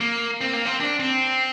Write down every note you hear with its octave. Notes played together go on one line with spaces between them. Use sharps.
A#3
C4
A#3
C4
D4
C4